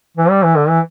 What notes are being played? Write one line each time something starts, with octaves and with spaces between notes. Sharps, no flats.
E3
G3
E3
D3
E3